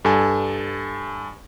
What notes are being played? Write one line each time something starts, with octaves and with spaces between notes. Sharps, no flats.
G2 A4 G#5